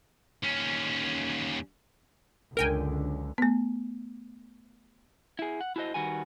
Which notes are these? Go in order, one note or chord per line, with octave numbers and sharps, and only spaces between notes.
D#2 C#4
C#2 F#2 D3 A#4 G5 G#5
A3 B3
E4 G#4
F#5
E4 F#4 A4 C5 D#5
D#3 G3 F#4 B4 G#5